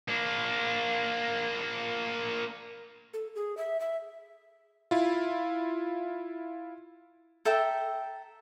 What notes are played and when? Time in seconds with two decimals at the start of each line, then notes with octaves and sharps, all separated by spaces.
0.08 A#3 D4
3.14 A4
3.35 G#4
3.57 E5
3.80 E5
4.91 E4 F4
7.45 A4 E5 G5 A#5